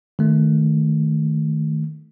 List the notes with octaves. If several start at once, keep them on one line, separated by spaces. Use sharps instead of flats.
D#3 A3